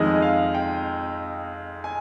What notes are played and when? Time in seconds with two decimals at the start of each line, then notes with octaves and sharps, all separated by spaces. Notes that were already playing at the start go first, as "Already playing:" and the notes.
Already playing: F2 D#3 G#3 D#5
0.22 F5
0.54 G5
1.84 G#5